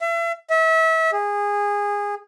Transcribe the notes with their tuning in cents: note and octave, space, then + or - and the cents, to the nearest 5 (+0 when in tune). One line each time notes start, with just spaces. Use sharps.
E5 +35
E5 -30
G#4 -20